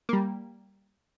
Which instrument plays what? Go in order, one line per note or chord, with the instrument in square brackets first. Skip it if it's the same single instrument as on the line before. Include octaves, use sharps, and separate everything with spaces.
[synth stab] G3 A#3